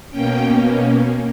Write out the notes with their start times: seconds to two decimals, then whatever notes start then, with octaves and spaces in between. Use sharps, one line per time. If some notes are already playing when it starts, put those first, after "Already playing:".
0.11 B2 A#3 C#4 G5